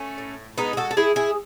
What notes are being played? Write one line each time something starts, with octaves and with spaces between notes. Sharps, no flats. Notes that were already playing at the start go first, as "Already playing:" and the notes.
Already playing: A3 C#4
A2
G#3 B3 D#4
G#4
F#4 A4
A4
G#3 E4 G#4
E4 G#4